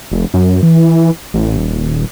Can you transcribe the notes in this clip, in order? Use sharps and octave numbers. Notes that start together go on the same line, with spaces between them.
F1
F#2
E3
A1
D#1